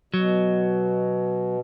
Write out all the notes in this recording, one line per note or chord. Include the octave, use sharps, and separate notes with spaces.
B2 F#3